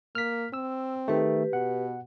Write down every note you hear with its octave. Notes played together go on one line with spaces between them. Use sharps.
A#3 F6 B6
C4 E6
D#3 A3 G4 B4
B2 F#5